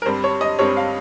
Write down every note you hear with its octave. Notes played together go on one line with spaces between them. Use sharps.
A#4
G2 G3 C4 C5
C#5
D#5
G2 G3 C4 C#5
F5